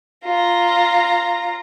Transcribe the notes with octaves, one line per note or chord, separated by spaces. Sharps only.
F4 A#5